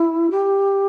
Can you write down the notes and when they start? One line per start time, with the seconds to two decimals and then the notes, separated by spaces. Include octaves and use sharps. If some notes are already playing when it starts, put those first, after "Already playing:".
Already playing: E4
0.30 G4